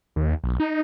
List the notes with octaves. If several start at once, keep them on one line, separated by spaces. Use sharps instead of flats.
D#2
B1
D#4